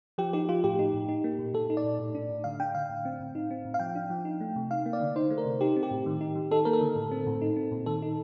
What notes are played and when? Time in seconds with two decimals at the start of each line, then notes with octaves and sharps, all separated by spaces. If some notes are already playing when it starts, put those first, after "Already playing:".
0.18 F3 G4
0.33 D#4 G4
0.49 F3 F4
0.64 A2 G4
0.79 D#4
0.94 A2
1.09 D#4
1.24 A#3
1.39 A#2
1.54 A#2 A4
1.70 D#4
1.77 D5
1.84 A#2
1.99 A2
2.15 D4
2.29 A2
2.44 D3 F5
2.60 D4 G5
2.75 D3 F5
2.90 A2
3.05 C4
3.20 A2
3.35 D#4
3.51 C4
3.65 A2
3.74 F5
3.79 F3 G5
3.95 D4
4.10 F3
4.25 D#4
4.41 A3
4.56 C3
4.71 D#4 F5
4.86 A#3
4.93 D5
5.01 D3
5.16 D#4 C5
5.31 A3
5.38 A#4
5.45 C3
5.61 D#4 G4
5.76 C4
5.83 G4
5.91 A2
6.06 D#3
6.21 D#4
6.35 D#3
6.51 D#4 A4
6.65 A#3 A#4
6.73 A4
6.81 D3
6.96 A2
7.11 C4
7.26 A2
7.42 D#4
7.56 C4
7.72 A#2
7.86 D#3 A4
8.02 D#4